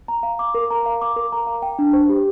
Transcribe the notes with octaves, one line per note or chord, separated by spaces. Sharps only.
A#5
F5
D6
A#4
A#5
F5
D6
A#4
A#5
F5
G5
D4
C5
G4